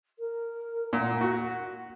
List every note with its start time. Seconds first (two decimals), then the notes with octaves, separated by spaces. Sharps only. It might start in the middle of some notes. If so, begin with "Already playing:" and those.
0.19 A#4
0.93 A#2 F#5
1.21 F#4